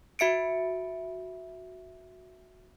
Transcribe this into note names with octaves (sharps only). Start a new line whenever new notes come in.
F#4 E5 C#7 D7